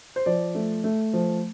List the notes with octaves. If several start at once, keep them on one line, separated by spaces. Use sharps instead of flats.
C5
F3 D5
A3
A3
F3